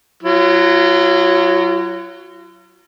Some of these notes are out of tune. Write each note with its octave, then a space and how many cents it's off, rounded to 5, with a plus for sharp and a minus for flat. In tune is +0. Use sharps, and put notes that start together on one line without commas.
F#3 +0 F4 -45